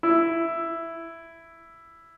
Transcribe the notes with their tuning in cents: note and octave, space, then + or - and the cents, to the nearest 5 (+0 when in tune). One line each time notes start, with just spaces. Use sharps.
E4 +5